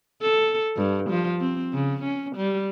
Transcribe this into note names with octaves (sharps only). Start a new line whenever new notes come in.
A4
G2
F3
C4
C#3
C#4
G3